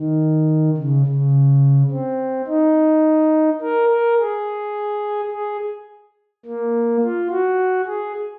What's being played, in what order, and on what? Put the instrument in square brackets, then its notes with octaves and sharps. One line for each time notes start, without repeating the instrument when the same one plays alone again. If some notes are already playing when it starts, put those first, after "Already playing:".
Already playing: [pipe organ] D#3
C#3
C#3
C4
D#4
A#4
A#4
G#4
G#4
A#3
F4
F#4
G#4